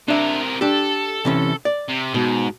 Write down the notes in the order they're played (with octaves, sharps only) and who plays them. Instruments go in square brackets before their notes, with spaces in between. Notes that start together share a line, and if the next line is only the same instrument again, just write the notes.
[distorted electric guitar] C3 A#4 [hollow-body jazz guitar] D4 E5
[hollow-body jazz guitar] D4 G4 [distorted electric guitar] A4
[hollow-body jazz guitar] C3 E3 C#4
D5
[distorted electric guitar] C3
[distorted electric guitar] G#2 [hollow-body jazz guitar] B2